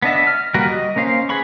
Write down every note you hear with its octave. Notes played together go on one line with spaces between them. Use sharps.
B3 D4 D#5 E5
F6
G3 A#3 F#4 A#4 B4
D#5
A#3 C#4 C5 F5
G#4 B4 B5 C#6